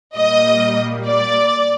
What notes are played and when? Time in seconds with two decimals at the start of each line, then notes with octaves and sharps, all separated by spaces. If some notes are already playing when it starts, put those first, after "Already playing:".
0.16 A#2 G3 A#3 D#5
1.06 D5